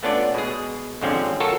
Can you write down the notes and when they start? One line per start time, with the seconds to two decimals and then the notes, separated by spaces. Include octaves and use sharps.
0.03 A3 B3 C#4 D4 F4 D5
0.34 B2 G#3 G#4
1.01 D#2 G#2 D3 F3 C4 C#4
1.40 F4 F#4 A4 A#4 C#5